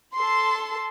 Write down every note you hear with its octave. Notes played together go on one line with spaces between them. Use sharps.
A4 C6